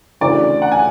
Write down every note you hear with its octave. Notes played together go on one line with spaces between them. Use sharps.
D2 C#3 E3 D5
F#5
G#5